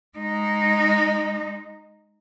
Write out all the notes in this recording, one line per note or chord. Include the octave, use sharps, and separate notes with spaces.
G#3 D#4